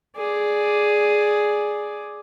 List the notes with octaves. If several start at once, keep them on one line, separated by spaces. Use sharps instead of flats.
G#4 D5